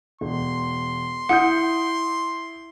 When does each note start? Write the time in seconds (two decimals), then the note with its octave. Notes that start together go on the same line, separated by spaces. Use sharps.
0.21 E1 C6
1.29 E4 F#5 D#6 G6